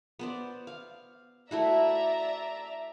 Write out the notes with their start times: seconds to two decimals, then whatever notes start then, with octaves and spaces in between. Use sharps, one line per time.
0.19 B3 C5 D5
0.67 F5
1.51 A3 E4 F#4 D5 E5 A#5